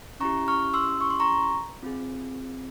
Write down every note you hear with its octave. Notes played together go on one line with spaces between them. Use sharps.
C#4 E4 G4 A#5 C#6
C#6 F6
C6 E6
C#6
C6
A#5 C#6
C4 F4 G#4